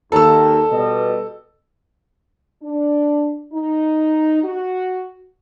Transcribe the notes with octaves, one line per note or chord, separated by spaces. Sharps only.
D#2 A4 E6
B2 G3 D#5
D4
D#4
F#4